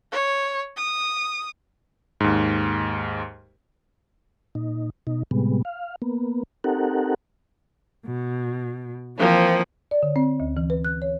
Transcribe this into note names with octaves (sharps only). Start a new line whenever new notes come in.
C#5
D#6
D#2 G#2
A#2 D#4
B2 D#4
A2 C3 G3 G#3 B3
F5
A#3 B3
C4 D#4 G4 A4 A#4 F#5
B2
E3 F3 A#3 C4
D5
D3
C4
D2
E3
B4
F#6
C#5